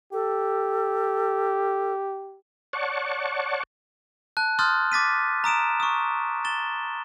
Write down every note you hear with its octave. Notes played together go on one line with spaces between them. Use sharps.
G4 A4
C#5 D5 F#5 A5 C#6
A5 F#6
C6 D#6 F6 G6 A6
D6 A6 B6 D#7
A#5 D#6 D7 E7
C#6 D#6
A6 E7 G7